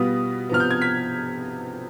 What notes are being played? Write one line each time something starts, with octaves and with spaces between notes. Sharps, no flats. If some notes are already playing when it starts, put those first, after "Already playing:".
Already playing: B2 G3 B3 F4 D#6
C3 F3 B3 F6
G6
G#6
B6